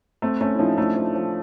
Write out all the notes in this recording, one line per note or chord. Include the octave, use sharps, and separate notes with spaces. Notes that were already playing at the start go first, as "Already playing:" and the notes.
A3 C4
A3 C#4
E4
F3 C#4 D#4
A3 D4 E4
F3
F3